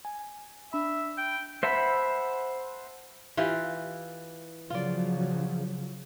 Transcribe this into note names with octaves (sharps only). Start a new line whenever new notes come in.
G#5
D4 E5 B5
G5
C5 E5 F#5 A5 B5
E3 F4 G4
C#3 F3 F#3 F4 D5